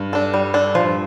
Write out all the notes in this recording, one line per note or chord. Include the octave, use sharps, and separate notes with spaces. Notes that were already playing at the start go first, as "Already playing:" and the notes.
Already playing: G2
D4 A4
G3
D4 A4
G2 F3